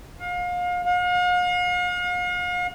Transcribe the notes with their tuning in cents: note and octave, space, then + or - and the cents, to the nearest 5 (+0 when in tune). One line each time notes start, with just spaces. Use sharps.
F5 +35
F5 +45